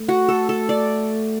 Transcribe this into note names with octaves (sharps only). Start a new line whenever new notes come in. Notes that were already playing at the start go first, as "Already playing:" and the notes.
Already playing: A3
F#4
A4
A4
D5